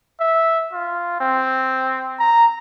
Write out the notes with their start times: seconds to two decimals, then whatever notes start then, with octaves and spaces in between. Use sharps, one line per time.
0.20 E5
0.73 F4
1.21 C4
2.19 A#5